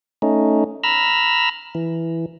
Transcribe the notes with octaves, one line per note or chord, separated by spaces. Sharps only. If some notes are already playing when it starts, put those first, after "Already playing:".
A3 C#4 D#4
A#5 B5 E6 F6
E3